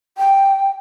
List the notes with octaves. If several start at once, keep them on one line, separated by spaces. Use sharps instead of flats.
G5